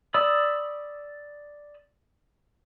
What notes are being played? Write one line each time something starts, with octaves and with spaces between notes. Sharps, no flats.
D5 B5 D#6 E6